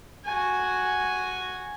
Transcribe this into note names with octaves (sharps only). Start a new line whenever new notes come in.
F#4 G#5